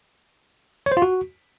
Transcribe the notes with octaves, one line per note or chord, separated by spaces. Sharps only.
C#5
C5
F4
F#4